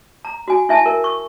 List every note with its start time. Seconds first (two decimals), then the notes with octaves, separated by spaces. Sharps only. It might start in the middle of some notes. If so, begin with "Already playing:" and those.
0.25 A#5
0.48 F#4 G#5
0.69 E4 E5 G#5 A5
0.86 A#4
1.04 C#6